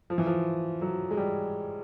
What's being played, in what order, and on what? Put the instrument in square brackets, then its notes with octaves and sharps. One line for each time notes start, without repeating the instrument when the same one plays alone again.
[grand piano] F3
E3
F3
F#3
G#3
G3